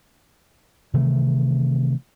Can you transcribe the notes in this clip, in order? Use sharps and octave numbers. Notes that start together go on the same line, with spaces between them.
C3 D#3 E3 A3